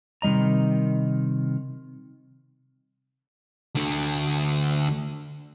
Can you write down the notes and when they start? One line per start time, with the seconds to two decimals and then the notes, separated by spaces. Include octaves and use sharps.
0.22 C3 D#3 G3 D#5 A#5
3.75 D2 D3